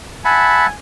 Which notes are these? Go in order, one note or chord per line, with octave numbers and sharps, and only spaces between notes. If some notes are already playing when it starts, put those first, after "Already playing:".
E5 F#5 G#5 A5 B5